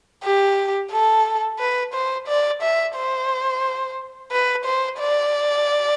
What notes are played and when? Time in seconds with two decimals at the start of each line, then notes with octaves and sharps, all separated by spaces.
0.25 G4
0.92 A4
1.59 B4
1.94 C5
2.27 D5
2.62 E5
2.96 C5
4.32 B4
4.65 C5
4.99 D5